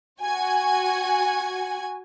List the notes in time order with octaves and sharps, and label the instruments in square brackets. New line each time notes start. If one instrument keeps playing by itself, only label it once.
[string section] F#4 G#5